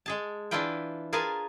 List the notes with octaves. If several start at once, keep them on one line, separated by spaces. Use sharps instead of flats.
G#3 G#4 A5
E3 D4 E4 F4 B4 G5
F4 G#4 A#4 B4 G#5 A5